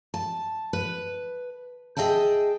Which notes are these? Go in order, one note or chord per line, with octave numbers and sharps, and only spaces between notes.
A5
B4
G#4 D#5 E5 G5 A5